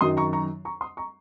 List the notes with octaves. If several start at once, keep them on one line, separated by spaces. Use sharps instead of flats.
F#2 D#3 F#3 C6 D#6
A#5 C#6
A#5 C#6
A#5 C#6
C6 D#6
A#5 C#6